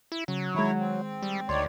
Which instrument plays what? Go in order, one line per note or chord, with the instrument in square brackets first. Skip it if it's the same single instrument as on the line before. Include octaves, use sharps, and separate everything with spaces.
[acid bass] E4
[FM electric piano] C#3 [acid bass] F#3
[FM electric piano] D#3 G#3 [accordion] E4 C#5
[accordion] C4
[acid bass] G3
[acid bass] D2 [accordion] D#3 C#5 D5 [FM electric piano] C6